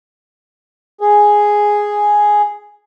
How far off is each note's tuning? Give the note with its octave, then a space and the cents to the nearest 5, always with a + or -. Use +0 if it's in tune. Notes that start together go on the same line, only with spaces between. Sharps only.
G#4 +0